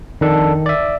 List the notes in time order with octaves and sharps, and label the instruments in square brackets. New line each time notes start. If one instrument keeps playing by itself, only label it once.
[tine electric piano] F2 D4 A4 [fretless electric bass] D#3
[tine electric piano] D5 E5